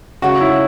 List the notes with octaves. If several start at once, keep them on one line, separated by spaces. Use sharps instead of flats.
C#3 F#3 A3 F#4
E4